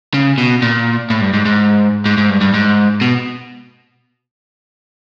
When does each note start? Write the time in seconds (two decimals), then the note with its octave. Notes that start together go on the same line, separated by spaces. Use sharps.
0.14 C#3
0.38 B2
0.62 A#2
1.10 A2
1.21 G2
1.33 G#2
1.45 G#2
2.06 G#2
2.18 G#2
2.29 G2
2.41 G2
2.54 G#2
3.01 B2